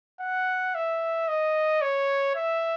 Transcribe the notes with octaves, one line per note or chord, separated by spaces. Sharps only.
F#5
E5
D#5
C#5
E5